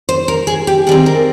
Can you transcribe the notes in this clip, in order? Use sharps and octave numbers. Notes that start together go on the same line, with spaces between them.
C5
A#4
G#4
G4
D#3 G3 C4 G#4
A#4